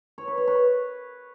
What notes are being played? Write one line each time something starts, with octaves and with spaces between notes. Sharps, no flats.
C#5
B4
C#5
B4